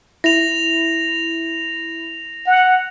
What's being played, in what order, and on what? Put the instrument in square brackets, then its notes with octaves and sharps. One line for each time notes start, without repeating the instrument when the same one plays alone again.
[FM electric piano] E4 [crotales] A#6 F7
[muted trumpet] F#5